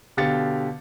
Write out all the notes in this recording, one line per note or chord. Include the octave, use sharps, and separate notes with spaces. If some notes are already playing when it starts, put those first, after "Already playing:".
B2 D3 G4 F5 A6 C#7